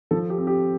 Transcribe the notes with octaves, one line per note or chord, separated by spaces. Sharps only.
F3 A4
G4
C4
G4